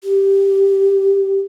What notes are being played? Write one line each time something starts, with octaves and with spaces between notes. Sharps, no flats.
G4